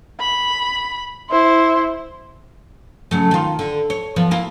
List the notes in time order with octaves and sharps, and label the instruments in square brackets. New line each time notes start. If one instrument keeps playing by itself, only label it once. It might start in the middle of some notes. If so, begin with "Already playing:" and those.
[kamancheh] B5
E4 C5
[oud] C#3 F#3 A3
D#3 F4
D3
C#5
F3 B3
A#3 E4 F4